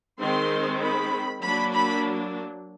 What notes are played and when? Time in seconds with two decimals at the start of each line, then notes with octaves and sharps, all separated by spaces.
0.20 D#3 G#3 C4 C6
0.82 B5
1.42 F#3 A#3 D4 B5
1.72 B5